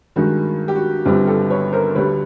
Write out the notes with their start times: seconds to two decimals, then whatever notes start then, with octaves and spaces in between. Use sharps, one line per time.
0.16 G2 D#3 G#3 F#4
0.68 G4
0.75 F#4
1.05 G1 G2 D3 G3 C4 F4 G4
1.27 G4 A4
1.50 B4 C#5
1.73 A#4 C5
1.95 D2 D3 G3 B4 C#5